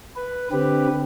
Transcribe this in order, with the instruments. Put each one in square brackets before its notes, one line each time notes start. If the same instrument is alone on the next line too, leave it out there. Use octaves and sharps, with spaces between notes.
[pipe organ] B4
D3 C4 G4 B4